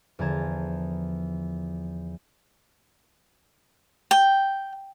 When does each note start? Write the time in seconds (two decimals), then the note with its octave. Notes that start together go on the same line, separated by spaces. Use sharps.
0.19 E2 D3 F3 A5 A#5 G#6
4.11 G5